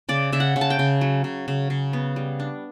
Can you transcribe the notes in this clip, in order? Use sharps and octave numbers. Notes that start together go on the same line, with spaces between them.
C#3 D5
C#3 E5
F#5
C#3
A5
G5
C#3
F#3
C#3
C#3
C#3
B3
G3
D4